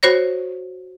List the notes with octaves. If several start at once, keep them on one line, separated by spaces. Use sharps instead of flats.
F#4 C5 C#5 A#6